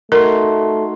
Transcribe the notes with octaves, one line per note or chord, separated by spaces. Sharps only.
A3 D#4 F#4 A#4 C6